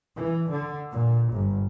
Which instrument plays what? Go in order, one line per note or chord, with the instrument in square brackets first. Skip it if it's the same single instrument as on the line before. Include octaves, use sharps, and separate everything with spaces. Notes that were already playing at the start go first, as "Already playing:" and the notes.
[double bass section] E3
D3
A#2
G1